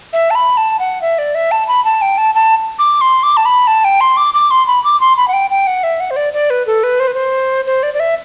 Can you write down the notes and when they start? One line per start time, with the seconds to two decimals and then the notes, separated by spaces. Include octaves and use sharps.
0.13 E5
0.30 A5
0.35 B5
0.57 A5
0.79 F#5
1.02 E5
1.18 D5
1.35 E5
1.51 A5
1.68 B5
1.85 A5
2.02 G5
2.18 A5
2.35 A5
2.79 D6
3.01 C6
3.23 D6
3.37 A5
3.45 B5
3.67 A5
3.84 G5
4.01 C6
4.17 D6
4.34 D6
4.51 C6
4.67 B5
4.84 D6
5.00 C6
5.17 B5
5.28 F#5
5.33 G5
5.50 G5
5.67 F#5
5.83 E5
6.00 F#5
6.11 C5
6.16 D5
6.33 D5
6.50 B4
6.67 A4
6.83 B4
7.00 C5
7.07 B4
7.14 C5
7.66 C5
7.83 D5
7.94 D5
8.00 E5